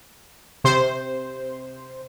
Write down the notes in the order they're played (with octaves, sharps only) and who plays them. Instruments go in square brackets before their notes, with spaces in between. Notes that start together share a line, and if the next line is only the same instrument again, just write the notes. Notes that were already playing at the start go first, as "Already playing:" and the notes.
[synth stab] C3 C5